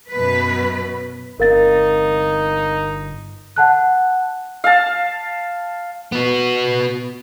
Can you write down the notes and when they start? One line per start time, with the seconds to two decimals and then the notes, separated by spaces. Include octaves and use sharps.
0.11 F#2 B2 B4
1.40 G1 D3 C4 D#4 A#4 F5 A6
3.56 F#5 A5 F#6
4.64 F5 A5
6.12 B3 F#4